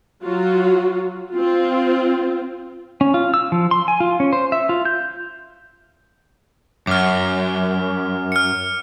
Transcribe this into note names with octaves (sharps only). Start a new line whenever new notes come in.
F#3 F4 F#4
C4 F4
C#4
F4
E6
F3
C6
G#5
F4
C#4
C5
E5
F4
G6
F#2 D6 F6
F6 C#7